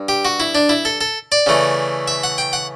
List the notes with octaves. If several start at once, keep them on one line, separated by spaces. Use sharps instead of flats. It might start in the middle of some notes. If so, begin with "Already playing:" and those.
Already playing: G2
G4
F#4
E4
D4
E4
A4
A4
D5
C#3 E3 A3
E5
F#5
G5
F#5